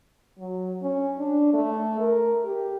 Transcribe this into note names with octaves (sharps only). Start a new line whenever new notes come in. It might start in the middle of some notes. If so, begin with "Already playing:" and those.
F#3
C#4
D4
A3
A#4
G4